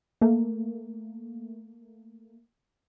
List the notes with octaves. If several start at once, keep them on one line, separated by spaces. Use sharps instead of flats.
A3 A#3